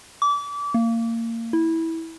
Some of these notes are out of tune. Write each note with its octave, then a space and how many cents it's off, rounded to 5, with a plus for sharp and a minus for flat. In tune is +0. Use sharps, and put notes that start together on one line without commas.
D6 -30
A#3 -25
E4 -15